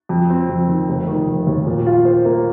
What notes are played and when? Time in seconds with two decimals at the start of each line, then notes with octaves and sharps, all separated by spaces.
0.09 F2
0.30 C4
0.49 F2
0.68 D#3
0.89 F1
1.07 D#3
1.27 F1
1.47 D#2
1.66 A#2
1.86 F4
2.05 C5
2.25 A#3